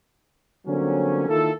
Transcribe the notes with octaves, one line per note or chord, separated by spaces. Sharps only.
D3 F#3 G3 A#3 C4 C#4
D#3 A#3 E4 F4 A4